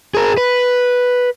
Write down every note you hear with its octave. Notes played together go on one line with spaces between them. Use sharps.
G#4 A#4
B4